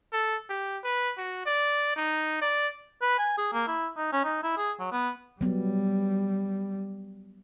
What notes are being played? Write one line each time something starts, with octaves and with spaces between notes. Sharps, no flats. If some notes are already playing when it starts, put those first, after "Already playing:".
A4
G4
B4
F#4
D5
D#4
D5
B4
G#5
G#4
A#3
E4
D#4
C#4
D#4
E4
G#4
F#3
B3
F#3 G3 B3